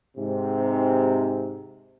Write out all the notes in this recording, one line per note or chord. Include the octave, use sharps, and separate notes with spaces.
G#2 C3